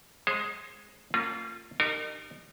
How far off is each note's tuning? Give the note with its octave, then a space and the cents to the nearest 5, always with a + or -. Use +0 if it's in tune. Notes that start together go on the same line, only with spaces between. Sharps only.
G#3 +0 G#4 +0 C5 +35
A#3 -40 C#4 -30 F4 -5
D#4 -40 G4 -15 A#4 -25